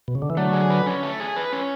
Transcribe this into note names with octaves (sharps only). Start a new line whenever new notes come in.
B2
C#3
D3
E3
D3 F#3 A3
G#4
B4
C#4
A3
G#4
B4
C#4